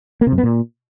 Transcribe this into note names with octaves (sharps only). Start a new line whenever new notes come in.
A#3
C3
F#2
B3
A#2